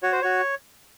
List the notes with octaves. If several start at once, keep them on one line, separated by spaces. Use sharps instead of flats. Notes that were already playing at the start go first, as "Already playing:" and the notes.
F#4 C#5
C5
F#4 C#5